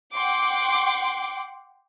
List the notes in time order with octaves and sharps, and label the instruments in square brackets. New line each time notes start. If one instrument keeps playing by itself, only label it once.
[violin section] F#5 G5 C6 D6